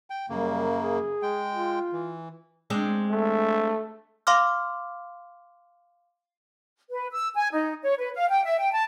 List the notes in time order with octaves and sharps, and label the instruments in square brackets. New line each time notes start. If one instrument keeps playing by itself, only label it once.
[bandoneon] G5
[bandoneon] F#2 C#3 A#3 [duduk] G3
[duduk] G#4
[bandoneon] G#3 G5
[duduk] F4
[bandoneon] E3
[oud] G#3 C4 D4
[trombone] A3
[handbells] F5 C6 D6 F6
[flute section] B4
E6
G#5
D#4
C#5
B4
F5
G5
E5
G5
A5